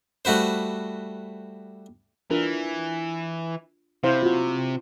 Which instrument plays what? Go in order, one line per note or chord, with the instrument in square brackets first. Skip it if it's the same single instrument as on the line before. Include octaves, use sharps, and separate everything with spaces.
[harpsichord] G3 A3 F#4 B4 C5
[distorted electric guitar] E3 [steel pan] D4 F4 A#4
[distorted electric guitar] C3 [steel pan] E4 C5 F5
[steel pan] F4 F#4